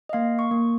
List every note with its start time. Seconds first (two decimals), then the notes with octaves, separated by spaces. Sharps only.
0.09 D#5
0.13 A#3 F5
0.39 C#6
0.51 A#3